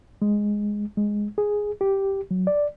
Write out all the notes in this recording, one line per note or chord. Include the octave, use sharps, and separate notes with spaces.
G#3
G#3
G#4
G4
F#3
D5